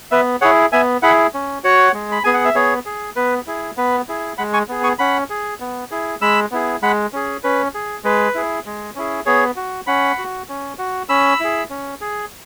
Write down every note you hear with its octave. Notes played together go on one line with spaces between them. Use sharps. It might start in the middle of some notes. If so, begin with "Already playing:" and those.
B3 B4 E5
E4 G#4 C#5 F#5
B3 E5 G#5
E4 G#4 F#5 B5
C#4
F#4 C#5 F#5
G#3
B5
B3 G#4 G#5
F#5
E5
B3 G#4 C#5
G#4
B3 B4
E4 G#4
B3 B4
E4 G#4
G#3 F#5 B5
G#5 C#6
B3 G#4
G#5 C#6
C#4 F#5 B5
G#4
B3
E4 G#4
G#3 B5 E6
B3 E4 G#4
G#3 F#5 B5
C#4 G#4
C#4 B4
G#4
G#3 B4
E4 G#4
G#3
C#4 E4 G#4
B3 G#4 C#5
F#4
C#4 F#5 B5
F#4
C#4
F#4
C#4 B5 E6
E4 G#4
C#4
G#4